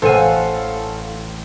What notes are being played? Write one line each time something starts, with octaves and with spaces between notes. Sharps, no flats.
A1 A4 C5 F5 F#5 G#5 E6